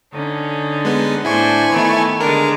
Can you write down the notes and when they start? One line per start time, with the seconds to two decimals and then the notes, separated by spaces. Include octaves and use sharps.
0.13 D3 C#4 D#4
0.85 G#3 B3
1.25 A2 D4 E4 C5 G#5 C#6
1.71 D#3 A3 B3
2.20 D3 G#3 D4 A#4